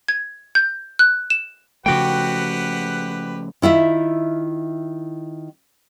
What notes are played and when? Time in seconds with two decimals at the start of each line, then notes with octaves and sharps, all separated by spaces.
0.08 G#6
0.55 G6
0.99 F#6
1.30 E7
1.86 C#3 F3 A3 F#4 G4 B4 F#5 G5
3.62 D#3 E4 F4 E5